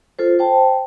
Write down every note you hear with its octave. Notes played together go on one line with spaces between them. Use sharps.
F4 A4 C5
C5 G5 A5